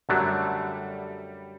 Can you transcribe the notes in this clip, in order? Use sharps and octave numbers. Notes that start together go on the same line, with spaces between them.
F#2 D3 F#3 G3 A3 D4